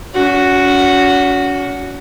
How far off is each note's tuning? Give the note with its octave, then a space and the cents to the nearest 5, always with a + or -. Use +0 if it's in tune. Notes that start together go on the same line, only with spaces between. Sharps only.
C#4 +40 F#4 +0